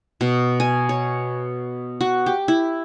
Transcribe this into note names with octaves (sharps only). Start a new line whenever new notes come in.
B2
G#5
C#5
F#4
G4
E4